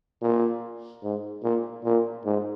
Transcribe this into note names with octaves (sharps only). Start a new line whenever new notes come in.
A#2
G#2
A#2
A#2
G#2